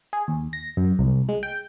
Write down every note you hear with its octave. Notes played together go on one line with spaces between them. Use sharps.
G#4
D#2
A#6
F#2
C2
G#3
G5